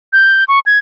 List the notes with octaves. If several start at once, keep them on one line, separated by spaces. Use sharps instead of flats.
G6
C#6
G#6